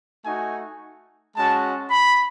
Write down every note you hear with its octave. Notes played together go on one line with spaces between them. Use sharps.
A3 D#4 F#4 G#5
G#3 C#4 F#4 A5
B5